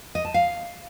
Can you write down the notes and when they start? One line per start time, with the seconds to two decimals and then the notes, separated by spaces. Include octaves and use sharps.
0.15 D#5
0.25 A5
0.34 F5